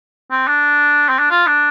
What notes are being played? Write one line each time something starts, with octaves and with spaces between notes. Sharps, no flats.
C4
D4
C4
D4
F4
D4